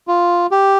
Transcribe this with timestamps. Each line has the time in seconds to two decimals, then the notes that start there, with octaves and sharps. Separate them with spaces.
0.08 F4
0.51 G4